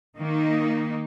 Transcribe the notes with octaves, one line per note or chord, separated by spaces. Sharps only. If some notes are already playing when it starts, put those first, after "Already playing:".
D#3 A#3 D#4